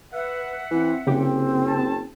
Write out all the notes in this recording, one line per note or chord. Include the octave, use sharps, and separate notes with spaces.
B4 E5 F#5
E3 C4
F#1 C#3 C4 G4 D6
A5